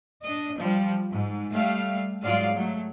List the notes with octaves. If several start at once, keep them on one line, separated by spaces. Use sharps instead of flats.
D4 D#5
F3 G3
G#2
G3 A3 F5
G#2 F#3 G#3 F4 D5 F5
F#3 A3